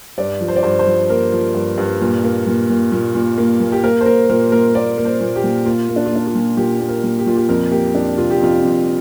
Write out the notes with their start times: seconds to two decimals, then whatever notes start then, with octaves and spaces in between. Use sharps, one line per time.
0.18 G2 D5
0.41 F3
0.48 C5
0.56 D5
0.63 G2 C5
0.79 C5
0.87 F3
1.09 A#3 A#4
1.32 F3
1.55 G2
1.78 G2
2.01 A#2
2.24 A#3
2.47 A#2
2.69 A#2
2.92 A#2
3.15 A#2
3.38 A#3
3.60 A#2
3.72 G4
3.83 A#3 A#4
4.01 C5
4.06 A#3 A#4
4.29 A#2 A#4
4.52 A#3 A#4
4.75 A#3 D5
4.98 A#3
5.05 C5
5.21 A#2
5.36 G4
5.44 A#2
5.66 A#3 F4
5.89 A#3
5.96 D4
6.06 F4
6.12 A#3 D4
6.27 F4
6.35 A#2
6.57 A#2 G4
6.80 A#3
6.89 A#4
7.03 A#2
7.18 G4
7.26 A#2 F4
7.36 G4
7.49 F2 A#4
7.71 A#3 G4
7.94 F2 D4
8.18 C3 F4
8.31 G4
8.40 F2 F4
8.63 F2